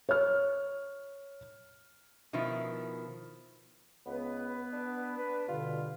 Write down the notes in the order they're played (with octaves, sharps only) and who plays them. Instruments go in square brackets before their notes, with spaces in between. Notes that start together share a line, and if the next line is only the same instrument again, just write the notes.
[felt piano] C#5 F6
[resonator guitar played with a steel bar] B2 D#3 F3 E4
[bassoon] C#2 [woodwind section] B3 B4
[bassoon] D4
[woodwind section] B4
[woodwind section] G2 B2 D3 [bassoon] F4